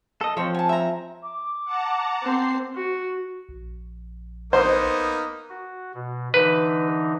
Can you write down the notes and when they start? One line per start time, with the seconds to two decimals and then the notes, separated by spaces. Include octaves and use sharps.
0.21 A4 D#5
0.37 F3 C4 C#5 C6
0.55 G#5 A5
0.69 E5 A#5
1.22 D6
1.65 F#5 A5 A#5
2.23 C4 C5 C7
2.75 F#4
3.49 A#1
4.53 A#3 B3 D#4 C5
5.49 F#4
5.94 B2
6.34 D3 E3 D#4 B4